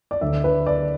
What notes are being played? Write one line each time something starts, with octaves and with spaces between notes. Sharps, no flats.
D5
D2 D3 E5
B4
D5